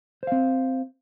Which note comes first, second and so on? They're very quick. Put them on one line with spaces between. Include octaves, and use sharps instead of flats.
C5 F5 C4